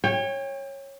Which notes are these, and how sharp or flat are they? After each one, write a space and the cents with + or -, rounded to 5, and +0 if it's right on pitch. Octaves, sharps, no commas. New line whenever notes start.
C#5 -15 G5 +30